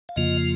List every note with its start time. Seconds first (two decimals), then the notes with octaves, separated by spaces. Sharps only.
0.09 F5
0.16 F2 C#3 F3 A#3 F4 D#5